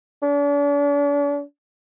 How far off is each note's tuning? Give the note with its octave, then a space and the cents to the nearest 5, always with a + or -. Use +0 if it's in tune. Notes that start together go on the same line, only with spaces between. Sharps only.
D4 -40